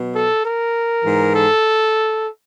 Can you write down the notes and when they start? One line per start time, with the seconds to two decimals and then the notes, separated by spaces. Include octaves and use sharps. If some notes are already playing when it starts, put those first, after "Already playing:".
Already playing: B2 F#3
0.15 A4
0.44 A#4
1.04 G#2 E3
1.34 A4